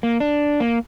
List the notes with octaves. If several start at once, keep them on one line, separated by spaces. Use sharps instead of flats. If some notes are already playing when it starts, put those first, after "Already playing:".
A#3
D4
A#3